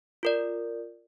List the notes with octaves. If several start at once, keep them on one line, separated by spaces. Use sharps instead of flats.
F4 A#4 D5